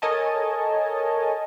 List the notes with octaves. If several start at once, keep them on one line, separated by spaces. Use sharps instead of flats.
A4 A#4 C#5 D#5 G#5 A5